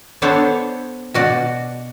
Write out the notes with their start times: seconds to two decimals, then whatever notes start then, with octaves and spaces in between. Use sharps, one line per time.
0.22 B3 D4 A4 C5 C#5
1.14 B2 F#4 D5